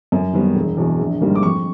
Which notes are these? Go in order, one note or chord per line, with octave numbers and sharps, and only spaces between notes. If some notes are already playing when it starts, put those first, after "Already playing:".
F#2
D#3 G3 B3
E1
E2 B2
A#1
G#2 D#3 G3 A#3
D6
F2 C#6